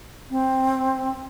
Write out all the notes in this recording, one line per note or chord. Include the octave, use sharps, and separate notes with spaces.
C4